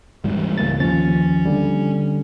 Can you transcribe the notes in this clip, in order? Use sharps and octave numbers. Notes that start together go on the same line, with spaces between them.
G#2 E3 G3
C#2 A#3 A6
D#2 F3 C#4 A6
D3 G3